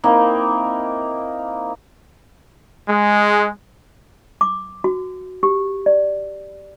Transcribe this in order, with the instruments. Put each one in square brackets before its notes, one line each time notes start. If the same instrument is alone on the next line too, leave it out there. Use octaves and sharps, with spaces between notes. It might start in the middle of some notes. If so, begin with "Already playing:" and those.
[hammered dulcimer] A#3 C4 D#4 E4
[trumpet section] G#3
[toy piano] D6
F#4
G4
D5